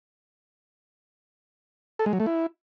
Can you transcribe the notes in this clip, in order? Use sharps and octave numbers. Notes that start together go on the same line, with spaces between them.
A4
G#3
F#3
A3
E4